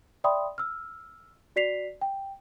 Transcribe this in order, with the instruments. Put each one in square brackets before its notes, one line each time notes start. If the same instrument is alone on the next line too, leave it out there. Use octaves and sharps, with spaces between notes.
[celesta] D5 E5 G5 B5 C6 D#6
E6 F6
F#4 D5 B6 C7 F7
G5